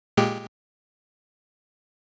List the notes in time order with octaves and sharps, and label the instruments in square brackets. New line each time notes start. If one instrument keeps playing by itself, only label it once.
[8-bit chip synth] A#2 G#3 G4